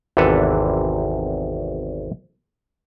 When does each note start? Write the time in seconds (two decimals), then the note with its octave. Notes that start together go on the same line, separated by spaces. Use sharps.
0.17 G#1 E2 C3 E3 A4 B4